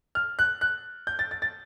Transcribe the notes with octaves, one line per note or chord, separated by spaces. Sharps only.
F6
F#6
F#6
G6
A6
A6
A6